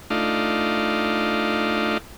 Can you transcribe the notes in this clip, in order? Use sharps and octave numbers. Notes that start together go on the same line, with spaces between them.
A3 D4 D#4 F4